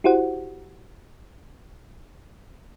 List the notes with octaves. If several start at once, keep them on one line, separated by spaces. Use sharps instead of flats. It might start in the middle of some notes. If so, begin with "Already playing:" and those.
E4 F#4 G4 C5 F#5